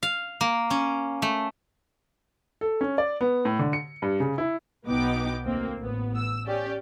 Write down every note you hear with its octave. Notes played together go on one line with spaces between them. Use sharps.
F5
A#3
C#4
A3
A4
C#4
D5
B3
A2
D3
C#7
G2
C#3
E4
B1 B2 B3 D#4 G5 D6
D2 A#3 C4
A1 B3
E6
C#4 G4 D5